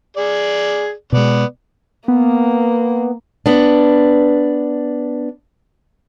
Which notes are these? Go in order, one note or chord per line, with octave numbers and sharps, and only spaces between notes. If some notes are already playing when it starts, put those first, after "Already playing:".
G#4 D5
B2 G#3 B3 D5
A#3 B3
B3 D4